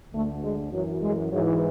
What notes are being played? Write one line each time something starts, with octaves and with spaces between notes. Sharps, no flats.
D2 D3 A3
G#3
F#2 E3 F#3
G#3
G#2 E3 F#3